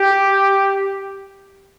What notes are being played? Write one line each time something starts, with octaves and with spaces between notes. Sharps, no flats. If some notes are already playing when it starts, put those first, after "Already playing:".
Already playing: G4